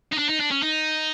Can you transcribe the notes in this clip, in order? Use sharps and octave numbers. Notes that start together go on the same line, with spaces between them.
D#4
D4
D#4
D4
C#4
D#4